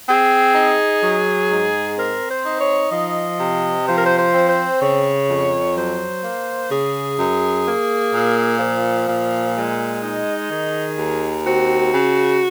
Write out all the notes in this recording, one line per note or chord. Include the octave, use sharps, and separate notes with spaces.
C4 G#4
D#4
F#3
G#2
C4 A#4
C5
D#4
C#5
F3 D#5
C3
F3 C5
A#4
C5
C5
C4
C5
C#3 C#5
F2
F#3 C5
A#3
C#3 G#4
F#2
A#3
A#2
F3
A#2
G#3
D#4
D#3 G#4
D#2
C4 F#4
C#3